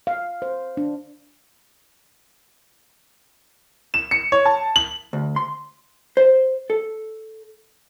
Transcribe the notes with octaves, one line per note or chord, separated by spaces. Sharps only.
F5
C5
D4
E7
C#7
C#5
A5
F#7
D2
C6
C5
A4